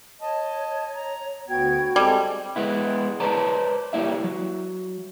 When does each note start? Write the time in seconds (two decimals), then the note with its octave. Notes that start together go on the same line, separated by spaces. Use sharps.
0.22 C#5 D#5 A5
0.95 A#5
1.48 D2 B3 F#4 G5 G#6
1.96 G3 G#3 C4 A4
2.56 G#3 B3 E4
3.20 B4 C5 D5 A5 A#5
3.93 G3 A#3 E4 E5
4.24 F#3